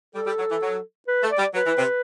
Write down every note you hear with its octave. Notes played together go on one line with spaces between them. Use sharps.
G3 A4
G3
F#3
E3
F#3
B4
A3
D5
G3
F#3 B4
E3
C3